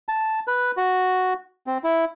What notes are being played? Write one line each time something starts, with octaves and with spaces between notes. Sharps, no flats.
A5
B4
F#4
C4
E4